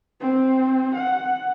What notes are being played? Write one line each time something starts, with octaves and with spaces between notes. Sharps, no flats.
C4
F#5